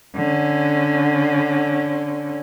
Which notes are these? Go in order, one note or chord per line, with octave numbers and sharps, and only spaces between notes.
D3 C#4